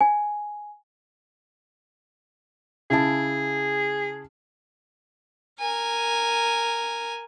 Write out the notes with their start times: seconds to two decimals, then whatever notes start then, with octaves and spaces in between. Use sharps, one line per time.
0.01 G#5
2.90 C#3 E4 G#4 A5
5.60 A#4 G#5